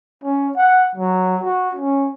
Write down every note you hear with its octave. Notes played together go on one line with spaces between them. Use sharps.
C#4
F#5
F#3
F#4
C#4